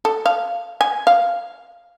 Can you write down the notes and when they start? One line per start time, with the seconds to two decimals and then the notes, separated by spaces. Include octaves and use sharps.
0.05 A4
0.26 F5
0.81 G#5
1.07 F5